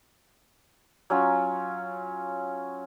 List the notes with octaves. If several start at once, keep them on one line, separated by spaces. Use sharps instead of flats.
F#3 C#4 F4